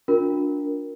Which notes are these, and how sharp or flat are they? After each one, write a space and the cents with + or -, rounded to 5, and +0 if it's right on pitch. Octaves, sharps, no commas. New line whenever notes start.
D4 -15 F4 +40 A#4 +0